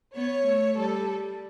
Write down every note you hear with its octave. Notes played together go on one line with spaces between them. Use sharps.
B3 C#5
A3
G3 A4